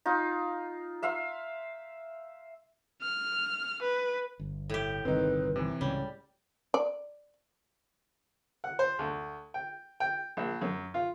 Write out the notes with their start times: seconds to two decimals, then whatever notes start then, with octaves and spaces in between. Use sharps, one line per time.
0.06 D#4 F4
1.03 E5 F5 C6
3.02 F6
3.82 B4
4.39 G1
4.70 A2 G4
5.05 G1 C2 D#3 C4 D#4 B4
5.56 C3 E3
5.81 C#2 A2 C#3 G3 C#5
6.74 D5
8.64 F#5
8.79 C5
8.99 D2
9.54 G5
10.00 G5
10.37 A#1
10.61 F#2
10.94 F4